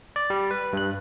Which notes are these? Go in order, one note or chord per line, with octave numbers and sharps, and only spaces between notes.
D5
G3
B4
G2 F#6